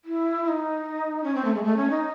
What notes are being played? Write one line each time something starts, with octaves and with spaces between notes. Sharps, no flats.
E4
E4
D#4
C#4
C4
A3
G#3
A3
C#4
D#4